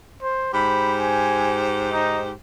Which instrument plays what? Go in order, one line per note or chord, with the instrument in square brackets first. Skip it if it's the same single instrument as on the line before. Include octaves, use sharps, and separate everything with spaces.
[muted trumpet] C5
[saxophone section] G#2 G4 C5 [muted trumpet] B5
[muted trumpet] G#5
D#4